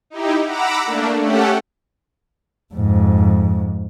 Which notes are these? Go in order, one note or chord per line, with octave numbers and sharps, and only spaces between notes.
D#4 E4 G4
F#5 A#5 B5 D6 E6
A3 A#3 D4
A3 C#4 G4 A4 F#5
F2 G#2